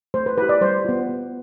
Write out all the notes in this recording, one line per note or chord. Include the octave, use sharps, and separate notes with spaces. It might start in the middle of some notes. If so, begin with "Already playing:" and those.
A3 C5
B4
E4 G4 B4
D5
G3 C5
B3 F4
B3